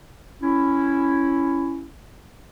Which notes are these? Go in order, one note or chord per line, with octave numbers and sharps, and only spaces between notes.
C#4 E4